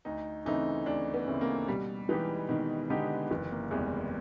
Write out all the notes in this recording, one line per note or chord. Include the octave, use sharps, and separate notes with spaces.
D2 D#4
C#3 E3 A3 C4 D#4
D2 D4
B3
C#3 E3 A3 C4
A#3
B2 G3
E3 G#3 B3 D#4 G4
B2 D#3
D3 G#3 B3 D#4 G4
F#1 E3
A#3
E2 C3 E3 G3 G#3